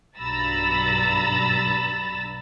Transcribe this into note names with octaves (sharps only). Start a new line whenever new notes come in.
B1 G2 A#5 B5 E6 A6